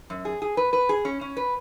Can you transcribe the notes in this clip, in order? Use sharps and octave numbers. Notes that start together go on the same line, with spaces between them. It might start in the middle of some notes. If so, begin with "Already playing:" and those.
F#2
G#4
G#4
B4
B4
G#4
C#4
C#4
B4